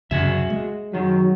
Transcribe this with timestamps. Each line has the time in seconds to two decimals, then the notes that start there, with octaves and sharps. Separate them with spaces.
0.11 C2 F#2 C#3 F#4 G#4 E5
0.50 G#3
0.93 F#2 D#3 F#3